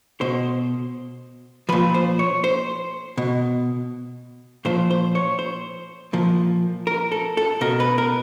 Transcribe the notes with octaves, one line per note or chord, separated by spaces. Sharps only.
B2 C5
A#2 F3 B4
C5
C#5
C5
B2
A#2 F3 C5
C5
C#5
C5
A#2 F3
A#4
A4
A4
B2 A#4
B4
A#4